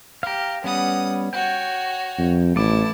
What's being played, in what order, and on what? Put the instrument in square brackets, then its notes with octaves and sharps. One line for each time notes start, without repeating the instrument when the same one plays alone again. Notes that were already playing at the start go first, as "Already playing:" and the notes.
[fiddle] G4 [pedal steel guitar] F5 A#5
[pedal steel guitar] G3 B3 C#4 [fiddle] F#5 D#6
[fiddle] F#4 C#5 [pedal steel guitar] G5
[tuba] F2
[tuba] A1 [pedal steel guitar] A3 D6 [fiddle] E4 A5